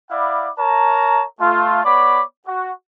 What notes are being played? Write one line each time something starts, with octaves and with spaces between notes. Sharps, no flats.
E4 D5 F5 F#5 B5 D6
A#4 C#5 A5 A#5
A3 F4
B3 C#5 D5 B5 D6
F#4